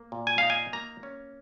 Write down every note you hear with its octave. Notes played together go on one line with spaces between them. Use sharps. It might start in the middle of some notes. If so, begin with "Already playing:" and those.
Already playing: A#3
A#2
G#5
D#4 F5
G#5
A#3 A#5
C#4